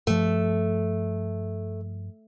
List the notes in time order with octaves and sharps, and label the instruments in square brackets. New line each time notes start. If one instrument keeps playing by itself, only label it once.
[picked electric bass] G2 F3 [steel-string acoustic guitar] A3